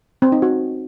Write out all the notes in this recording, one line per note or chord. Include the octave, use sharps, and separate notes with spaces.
C4
D#4
F#4